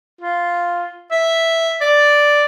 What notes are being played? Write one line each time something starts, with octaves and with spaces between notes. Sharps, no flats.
F4
E5
D5